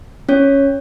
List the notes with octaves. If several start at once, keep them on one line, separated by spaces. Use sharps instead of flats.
C#4 C#5